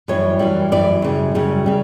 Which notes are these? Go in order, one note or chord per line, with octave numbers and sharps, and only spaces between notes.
F#2 E3 G3 C#5
F#2 E3 G3
F#2 E3 G3 D5
F#2 C#3 G3
F#2 C#3 G3
C#3 G3